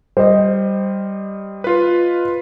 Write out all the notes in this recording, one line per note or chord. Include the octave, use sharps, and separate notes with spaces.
G3 C5 D#5
F4 B4